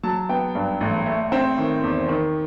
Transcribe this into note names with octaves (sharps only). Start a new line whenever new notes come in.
F#3 A5
B3 G5
G2
A1
A3
C4
D#3
E2
D#3